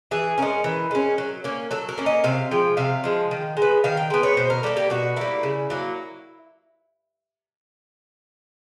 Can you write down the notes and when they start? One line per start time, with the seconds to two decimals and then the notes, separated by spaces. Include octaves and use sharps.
0.11 E3 G#4
0.38 G#3 C#4 A#4
0.64 E3
0.91 G#3 C#4
1.18 F#3
1.44 A#3 C#4
1.71 F#3 A4
1.89 A#4
1.98 A#3 C#4
2.06 D#5
2.24 C3 F5
2.51 F3 G#3 G5
2.77 C3 F5
3.04 F3 G#3
3.31 D#3
3.57 G#3
3.62 B3
3.84 D#3 F5
3.97 G5
4.10 G#3 B3 G5
4.23 C#5
4.37 B2 C5
4.50 A#4
4.63 G3 A#3 A4
4.77 G4
4.90 B2 F#4
5.16 G3 A#3 E4
5.43 C#3
5.70 F#3 A#3